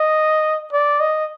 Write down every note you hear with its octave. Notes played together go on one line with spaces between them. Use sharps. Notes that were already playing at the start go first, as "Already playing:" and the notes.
Already playing: D#5
D5
D#5